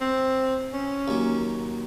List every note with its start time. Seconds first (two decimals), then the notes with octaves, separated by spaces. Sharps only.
0.01 C4
0.73 C#4
1.08 D#2 F#3